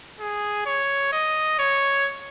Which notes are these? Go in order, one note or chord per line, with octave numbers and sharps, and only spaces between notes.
G#4
C#5
D#5
C#5